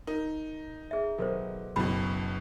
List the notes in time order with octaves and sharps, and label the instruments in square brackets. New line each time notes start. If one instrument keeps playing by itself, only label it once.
[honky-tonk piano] D#4 [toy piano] A#4
[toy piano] G#4 E5
[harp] B1 [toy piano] A4 A#4 C5
[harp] F#1 [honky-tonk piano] B1 B2 [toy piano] B5